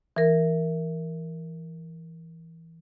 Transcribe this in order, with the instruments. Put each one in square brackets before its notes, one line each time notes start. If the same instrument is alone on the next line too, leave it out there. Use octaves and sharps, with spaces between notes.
[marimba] E3 A#4